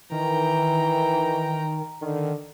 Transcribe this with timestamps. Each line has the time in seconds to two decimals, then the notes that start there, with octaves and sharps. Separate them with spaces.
0.11 D#3 E3 G5 A#5
2.02 D3 D#3